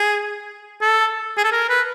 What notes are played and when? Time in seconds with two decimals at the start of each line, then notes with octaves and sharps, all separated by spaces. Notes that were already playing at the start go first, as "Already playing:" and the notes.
Already playing: G#4
0.82 A4
1.37 G#4
1.44 A4
1.52 A#4
1.69 B4